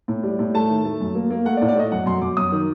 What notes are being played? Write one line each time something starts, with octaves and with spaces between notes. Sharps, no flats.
A2
G3
A2
A3 A5
D#3
A3
F#2
A#3
A#3
A3 F#5
D5
A2
D5
A3 D#5
F#2 F#5
F#2 C6
F#2 D6
F#2 D#6
D#3